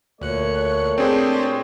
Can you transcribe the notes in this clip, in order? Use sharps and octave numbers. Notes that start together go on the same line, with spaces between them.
D2 A#2 A3 C#5 F#6 C#7
C4 D4 G4 G#4 C5